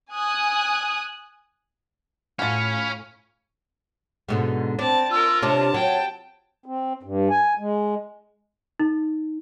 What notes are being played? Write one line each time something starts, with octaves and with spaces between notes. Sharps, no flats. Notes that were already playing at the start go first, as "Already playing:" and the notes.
G#5 D#6 F#6
A2 C#4 F4 F#4 F5 G#5 B5
G#2 B2 D3
C4 D4 A5
F4 A#4 E6
C3 C#4 D4 A5
F#3 G5
C4
G2
G#5
G#3
D#4